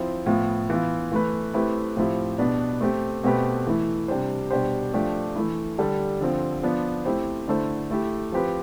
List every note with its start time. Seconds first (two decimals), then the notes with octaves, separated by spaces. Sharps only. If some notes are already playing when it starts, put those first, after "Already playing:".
Already playing: F3 C4 E4
0.26 A2 F3 B3 F4
0.70 E3 B3 F4
1.12 E3 A3 E4 B4
1.54 A3 C4 E4 G4 B4
1.96 A2 F3 C4 E4 G4
2.38 B2 B3 D4 G4 B4
2.81 A3 C4 G4
3.24 B2 A3 C4 G4 B4
3.67 E3 A3 E4
4.08 C3 G3 D4 G4 C5
4.51 B2 G3 D4 G4 C5
4.94 F3 A3 D4 G4
5.36 E3 A3 E4
5.78 D3 G3 D4 A4
6.21 D3 F3 C4
6.63 F3 B3 D4
7.05 A3 C4 E4 G4 C5
7.48 D3 A3 E4 A4 C5
7.91 A3 E4 G4
8.32 F3 C4 G4 B4